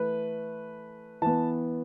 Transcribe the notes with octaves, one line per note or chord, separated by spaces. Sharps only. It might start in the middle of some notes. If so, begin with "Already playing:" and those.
Already playing: E3 A3 B4
E3 B3 A5